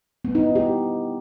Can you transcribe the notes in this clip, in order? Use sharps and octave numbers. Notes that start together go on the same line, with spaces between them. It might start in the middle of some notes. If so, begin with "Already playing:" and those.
B3
D#4
E4
G4